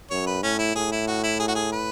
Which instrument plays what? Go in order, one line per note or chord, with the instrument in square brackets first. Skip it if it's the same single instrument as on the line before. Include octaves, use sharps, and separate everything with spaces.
[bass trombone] F#2 [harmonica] C#5
[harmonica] B4
[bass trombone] A2 [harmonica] C#4
[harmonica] E4
[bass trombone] A2 [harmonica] G#4
[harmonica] E4
F#4
E4
G#4
F#4
G#4
B4